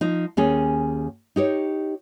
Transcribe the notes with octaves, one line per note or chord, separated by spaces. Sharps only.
F3 D#4
D#2 C#4 G#4
D#4 G4 C#5